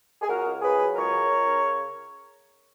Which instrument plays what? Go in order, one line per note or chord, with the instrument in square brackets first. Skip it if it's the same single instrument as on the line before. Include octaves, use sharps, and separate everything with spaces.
[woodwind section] G#4
C#2 F#4 A#4
C#2
C#3 G#4 B4
F#3
C#2 A#4 C#5
C#3
C#2
C#3